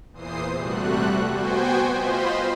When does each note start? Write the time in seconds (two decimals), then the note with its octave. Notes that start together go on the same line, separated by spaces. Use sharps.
0.12 E2 A#2 E3 C5 D#6 C7
0.54 C3 G3 A3 F#4 F#6
1.30 B3 F#4 C5 G5 G#5
1.91 F4 C5 D#5 B5 C6